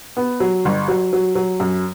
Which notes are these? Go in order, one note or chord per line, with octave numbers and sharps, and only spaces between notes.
B3
F#3
G1
F#3
F#3
F#3
F#2